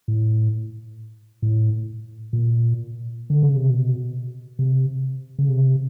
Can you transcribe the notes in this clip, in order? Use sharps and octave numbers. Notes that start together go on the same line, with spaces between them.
A2
A2
A#2
D3
C#3
C3
B2
C3
C#3
C3